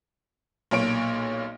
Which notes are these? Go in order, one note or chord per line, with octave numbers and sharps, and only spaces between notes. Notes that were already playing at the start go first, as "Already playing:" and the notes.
B1 A#2 C#5 D7